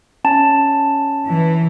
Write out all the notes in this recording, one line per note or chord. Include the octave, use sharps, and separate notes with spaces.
C#4 A5
E3